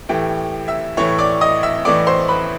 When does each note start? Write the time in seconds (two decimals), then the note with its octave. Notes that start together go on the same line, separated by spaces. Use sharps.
0.09 A2 E3 A3 G4 G5
0.68 E5 E6
0.97 A2 E3 A3 C#5 C#6
1.18 D5 D6
1.41 D#5 D#6
1.63 E5 E6
1.85 A2 E3 A3 D5 D6
2.07 C5 C6
2.28 B4 B5